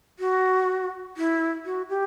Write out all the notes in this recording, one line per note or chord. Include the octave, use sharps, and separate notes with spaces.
F#4
E4
F#4
G4